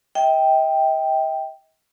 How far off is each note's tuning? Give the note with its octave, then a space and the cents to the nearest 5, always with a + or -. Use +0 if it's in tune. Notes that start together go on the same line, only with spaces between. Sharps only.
D#5 +45 G5 +0